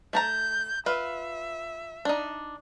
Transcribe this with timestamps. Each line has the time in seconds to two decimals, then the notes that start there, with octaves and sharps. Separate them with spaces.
0.13 A3 A5 A#5 G6
0.86 F4 B4 E5
2.05 D4 D#4